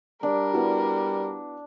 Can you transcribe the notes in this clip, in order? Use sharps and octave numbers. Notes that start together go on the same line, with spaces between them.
G3 D4 A#4
B3 E4 F#4